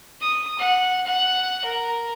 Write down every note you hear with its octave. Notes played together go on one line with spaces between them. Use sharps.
D#6
F#5
F#5
A#4